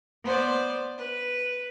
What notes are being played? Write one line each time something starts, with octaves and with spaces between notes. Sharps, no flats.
B3 C5 D5
B4